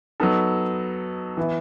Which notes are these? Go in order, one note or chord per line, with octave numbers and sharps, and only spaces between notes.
F#3 B3 D#4 A4
E3 B3 E4